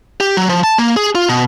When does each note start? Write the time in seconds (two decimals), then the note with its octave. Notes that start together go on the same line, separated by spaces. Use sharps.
0.20 G4
0.37 F#3
0.49 F3
0.64 A5
0.78 A#3
0.97 G#4
1.15 F4
1.29 B2